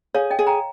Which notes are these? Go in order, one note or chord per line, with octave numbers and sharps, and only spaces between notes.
G#4 C#5 F5
D#5 G5
G#4
G5 A#5